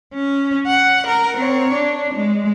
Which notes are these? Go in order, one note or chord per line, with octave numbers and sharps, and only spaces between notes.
C#4
F#5
A#4
C4 C#5
D4
G#3